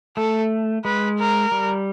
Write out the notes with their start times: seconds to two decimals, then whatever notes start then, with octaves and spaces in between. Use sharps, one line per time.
0.17 A3 A4
0.84 G#3 B4
1.18 A#4
1.52 G3